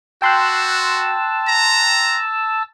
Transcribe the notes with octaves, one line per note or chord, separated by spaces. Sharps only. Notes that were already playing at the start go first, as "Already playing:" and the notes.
F#4 G5 A5 C6 E6 F#6
A#5